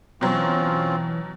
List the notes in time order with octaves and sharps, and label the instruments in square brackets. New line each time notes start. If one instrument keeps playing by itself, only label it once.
[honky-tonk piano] B2 F#3 [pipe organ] E3 [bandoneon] C4 [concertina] C#4 F4